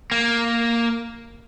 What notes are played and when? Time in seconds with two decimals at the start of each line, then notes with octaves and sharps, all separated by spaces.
0.11 A#3